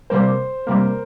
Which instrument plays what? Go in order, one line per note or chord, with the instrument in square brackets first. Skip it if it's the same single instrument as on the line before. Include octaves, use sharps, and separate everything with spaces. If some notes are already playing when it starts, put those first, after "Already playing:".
[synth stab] C3 G3 A#3 [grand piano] C5
[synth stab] C3 G3 A#3 [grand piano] A#4